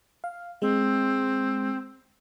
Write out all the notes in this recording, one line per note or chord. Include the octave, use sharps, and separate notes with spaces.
F5
G#3 C4